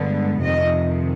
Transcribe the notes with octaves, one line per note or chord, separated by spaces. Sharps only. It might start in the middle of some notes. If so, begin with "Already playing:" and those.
Already playing: G2 D3 G#3 B3
F2 C3 D#3 D#5